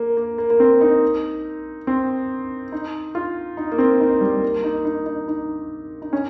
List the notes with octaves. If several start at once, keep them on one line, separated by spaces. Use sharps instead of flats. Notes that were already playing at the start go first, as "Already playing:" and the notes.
Already playing: A#3
A#3
A#3
A#3
C4
D#4
C4
D#4
F4
D#4
A#3
C4
D#4
G3
A#3
D#4
D#4
D#4
D#4
D#4
C#4